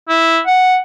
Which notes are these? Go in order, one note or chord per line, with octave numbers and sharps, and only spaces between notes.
E4
F#5